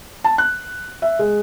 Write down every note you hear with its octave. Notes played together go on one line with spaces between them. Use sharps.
A5
F#6
E5
G#3